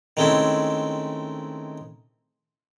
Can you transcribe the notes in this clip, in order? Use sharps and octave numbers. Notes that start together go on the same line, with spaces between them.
D#3 G#3 A3 C4 C#4 E4